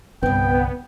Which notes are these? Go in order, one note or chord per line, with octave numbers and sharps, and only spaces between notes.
C2 G2 D3 B3 C4 G5